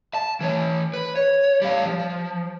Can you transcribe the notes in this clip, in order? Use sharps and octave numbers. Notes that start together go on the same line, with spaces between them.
A5
E3 C#5
B4
C#5
G3 F5
F3